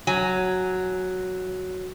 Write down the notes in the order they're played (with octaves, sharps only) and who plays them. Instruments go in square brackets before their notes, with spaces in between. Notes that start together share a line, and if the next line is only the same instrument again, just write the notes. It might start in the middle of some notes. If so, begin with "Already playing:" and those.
[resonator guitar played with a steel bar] F#3 G#5